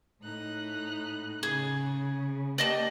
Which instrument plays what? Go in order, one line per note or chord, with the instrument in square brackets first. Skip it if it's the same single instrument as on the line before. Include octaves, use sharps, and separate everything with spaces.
[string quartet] A2 D#4 F#6
[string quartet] C#3 [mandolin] G#4
[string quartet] A#3 G4 [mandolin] D5 D#5 A5